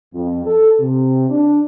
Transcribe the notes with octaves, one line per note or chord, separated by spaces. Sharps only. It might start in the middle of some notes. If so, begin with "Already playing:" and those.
F2
A4
C3
D4